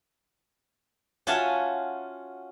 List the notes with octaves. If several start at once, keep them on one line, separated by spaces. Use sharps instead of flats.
C#4 F4 F#4 E5 G#5 A5